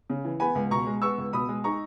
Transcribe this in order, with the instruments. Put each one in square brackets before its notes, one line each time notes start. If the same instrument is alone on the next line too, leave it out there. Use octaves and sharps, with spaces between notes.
[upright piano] C#3
E3
B3 G#5 B5
C#2
B2 A#5 C#6
G#3
B3 C#6 E6
C#2
B2 B5 D#6
G#3
D#4 A#5 C#6